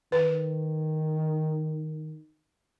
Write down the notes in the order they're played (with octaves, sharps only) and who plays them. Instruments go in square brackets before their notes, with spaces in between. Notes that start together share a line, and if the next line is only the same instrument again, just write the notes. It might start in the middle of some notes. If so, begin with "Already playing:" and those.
[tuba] D#3 [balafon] B4